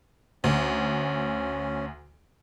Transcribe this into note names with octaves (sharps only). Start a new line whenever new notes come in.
D2 C#4